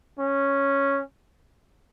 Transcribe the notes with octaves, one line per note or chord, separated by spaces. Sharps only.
C#4